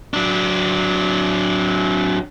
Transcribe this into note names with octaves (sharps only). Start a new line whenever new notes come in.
F#3 D4